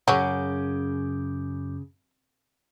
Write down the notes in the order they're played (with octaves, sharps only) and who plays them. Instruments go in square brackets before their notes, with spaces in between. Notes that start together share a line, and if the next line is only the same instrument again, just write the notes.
[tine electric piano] F#2 D6 G6 [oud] C#3 [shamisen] F#3 C#4